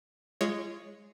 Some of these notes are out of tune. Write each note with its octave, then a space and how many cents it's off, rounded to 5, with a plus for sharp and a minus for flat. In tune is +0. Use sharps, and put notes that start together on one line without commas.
G#3 +0 F4 -30 C#5 +0